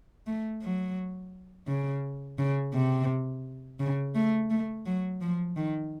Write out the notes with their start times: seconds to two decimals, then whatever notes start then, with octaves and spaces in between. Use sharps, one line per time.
0.27 A3
0.62 F#3
1.67 C#3
2.39 C#3
2.74 C3
3.80 C#3
4.15 A3
4.50 A3
4.86 F#3
5.21 F3
5.56 D#3